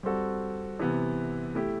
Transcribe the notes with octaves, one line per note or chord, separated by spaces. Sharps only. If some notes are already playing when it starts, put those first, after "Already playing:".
G3 C4 F#4 A4
C3 E3 B3
A3 E4 G4